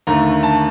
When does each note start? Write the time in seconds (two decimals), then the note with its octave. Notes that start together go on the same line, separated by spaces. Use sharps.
0.07 D#2 D3 A3 A#5
0.43 A5